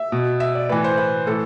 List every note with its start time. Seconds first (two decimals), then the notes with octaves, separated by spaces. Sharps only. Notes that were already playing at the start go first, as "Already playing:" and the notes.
Already playing: E5
0.12 B2
0.40 E5
0.55 D5
0.69 A2 E3 B4
0.84 C5
0.97 B4
1.26 A2 E3 A4